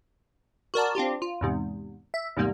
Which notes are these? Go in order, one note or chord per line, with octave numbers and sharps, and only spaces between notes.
F#4 A#4 D5 A5
C4 D4 F4 G4
F4
E2 G#2 C3
E5
E2 G#2 C3 G3 A#3